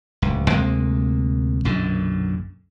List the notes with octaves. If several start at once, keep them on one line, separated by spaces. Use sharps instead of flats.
D1 C#2
D2 C3 G#3 A#3
B1 F#2 A#2 D3